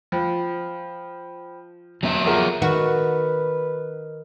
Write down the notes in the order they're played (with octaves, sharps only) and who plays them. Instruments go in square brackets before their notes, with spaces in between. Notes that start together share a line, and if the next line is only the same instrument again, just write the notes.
[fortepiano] F3 [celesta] C5 G5 B5
[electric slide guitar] F#3 B3 E5
[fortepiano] F3 A#4 [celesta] G#4 F#5
[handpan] D#3 [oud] F#4 [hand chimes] A#4 D#5 F6 [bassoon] B4